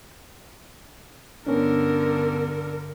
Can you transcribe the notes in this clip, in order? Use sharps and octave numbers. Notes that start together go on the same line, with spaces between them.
G2 D3 B3 C#4 D4 A#4